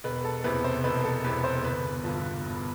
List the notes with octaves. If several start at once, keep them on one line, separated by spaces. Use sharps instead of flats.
E1 B4
A4
E2 C3 B4
C5
E1 B4
A4
E2 C3 B4
C5
G1 B4
G2 D3 F3
G1